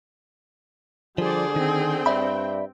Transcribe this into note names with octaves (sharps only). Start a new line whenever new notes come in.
D3 F3 G3 G#4 C5 D5
D#3 C4 G5
G2 D5 E5 B5